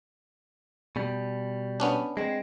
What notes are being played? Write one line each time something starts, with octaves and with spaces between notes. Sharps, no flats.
B2 G3
B3 C#4 D4
G#3 C4